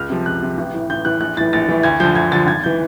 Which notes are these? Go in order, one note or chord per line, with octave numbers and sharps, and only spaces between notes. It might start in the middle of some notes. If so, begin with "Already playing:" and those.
Already playing: C#2 F6
C3 F3
C#2 F#6
C3 F3
A1
A2 E3
A1 G6
A2 E3 F#6
A#1 F#6
A2 E3 A6
A#1 A6
A2 E3
D2 G#6
D3 F3 G6
D2 G#6
D3 F3 A6
G#1 G#6
E3 G6